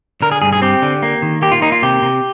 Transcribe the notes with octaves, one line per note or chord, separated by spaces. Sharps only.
D3 A#4
G#4
G2 G#4
G#4
C4 G4
D3
A#3
D#3
A#3 G4
F4
A#3 D#4
F4
C3 G4
C3